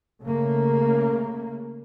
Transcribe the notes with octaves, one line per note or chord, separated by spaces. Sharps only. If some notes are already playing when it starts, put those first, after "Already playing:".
C#3 A3 A#3